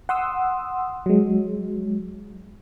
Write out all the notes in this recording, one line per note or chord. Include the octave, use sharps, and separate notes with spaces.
F#5 C6 D#6 E6
F#3 G#3